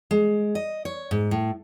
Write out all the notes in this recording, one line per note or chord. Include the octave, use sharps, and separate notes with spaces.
G#3
D#5
C#5
G#2
A2